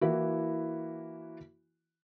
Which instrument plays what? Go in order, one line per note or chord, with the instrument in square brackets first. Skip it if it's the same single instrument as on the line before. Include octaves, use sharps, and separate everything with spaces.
[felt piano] E3 A#3 E4 F#4